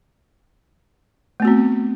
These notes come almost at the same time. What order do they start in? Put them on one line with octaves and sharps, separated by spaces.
A3 B3 F#4 C4